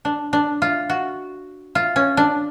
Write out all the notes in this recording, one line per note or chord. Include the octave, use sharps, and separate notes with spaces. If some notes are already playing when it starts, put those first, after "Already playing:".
D4
D4
F4
F#4
F4
C#4
D4